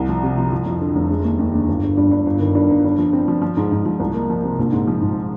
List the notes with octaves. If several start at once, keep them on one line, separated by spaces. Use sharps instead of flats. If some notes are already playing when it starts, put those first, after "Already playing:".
Already playing: C2
F3
C3
F3
F3
F2
D3
F1
G#3
D#2
D#2
D3
G1
D3
G2
G2
G1
D#3
G2
G1
G2
F3
C4
F3
F3
G#2
G#2
F3
C2
A#3
F3
C3
A#1
G#2
F3
G#2